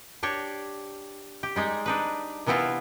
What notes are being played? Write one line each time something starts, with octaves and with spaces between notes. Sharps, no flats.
D4 G4 C#5
G4
G3 G#3 D#4 G#4
D4 D#4 B4
C3 E3 B3 C4 E4 F4